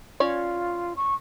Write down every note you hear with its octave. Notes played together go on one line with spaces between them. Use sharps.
C#4 F4 C#5 D5
C#6